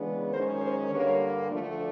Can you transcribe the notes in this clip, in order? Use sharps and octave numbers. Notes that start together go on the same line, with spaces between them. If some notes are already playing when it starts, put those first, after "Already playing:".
Already playing: C#3 E3 G#3 B3 D4
F#2 D#3 G#3 C#4 A#4 C5
A#4 C5
G2 D3 G3 A#3 B4 C#5
D2 D3 F3 A3 D4